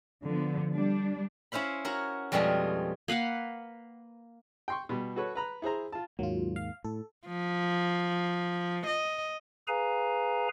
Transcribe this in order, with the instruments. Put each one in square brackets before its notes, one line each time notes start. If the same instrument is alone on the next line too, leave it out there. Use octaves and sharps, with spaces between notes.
[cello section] D3 F3 B3
G3 D4
[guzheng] C#4 E4 C5 F5 B5
F#4 A#4 C#5
F2 B2 G3 G#3 F4 G#4
[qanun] A#3 B4 F5 F#5
[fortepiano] G5 C6 C#6
B2 G3
F#4 A4 B4 C#5
B4 A#5 B5
E4 G#4 C5 A#5
F4 A5
[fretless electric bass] D#2 G#2 A#3 [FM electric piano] F#3 F4
[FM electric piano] F5
[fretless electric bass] A2 [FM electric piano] A4
[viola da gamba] F3
D#5
[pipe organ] G#4 B4 F5 G#5 A#5